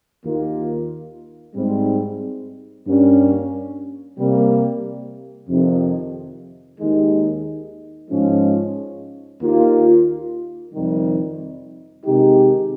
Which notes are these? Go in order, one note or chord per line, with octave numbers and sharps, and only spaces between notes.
D#2 D#3 A#3 F4
G#2 G3 C4
G2 G3 A#3 C#4
C3 G3 A#3
F2 C3 D#3
D#2 D#3 G#3 D#4
G#2 F3 G#3 C#4
D#2 D#3 A#3 F4
F2 C3 D#3 G3
C3 D#3 G#3 D#4 G4